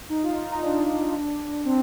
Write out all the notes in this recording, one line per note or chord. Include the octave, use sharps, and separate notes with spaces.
D#4
F4
D#4
D#4
D4
C4